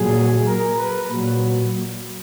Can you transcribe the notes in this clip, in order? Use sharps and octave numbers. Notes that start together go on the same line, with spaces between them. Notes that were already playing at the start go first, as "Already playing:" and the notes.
Already playing: A#2 F#3 G#4
A#4
B4
A#2 F#3